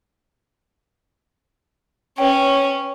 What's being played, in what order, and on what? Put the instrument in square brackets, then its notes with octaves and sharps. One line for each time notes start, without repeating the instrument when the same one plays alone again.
[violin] C#4 [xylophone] B4 C#5 G5